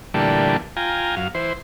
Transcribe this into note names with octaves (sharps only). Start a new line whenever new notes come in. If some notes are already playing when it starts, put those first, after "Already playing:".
A#2 D3 E3 G3 A3
F4 G5 G#5 A#5
F#2 F5
E3 C5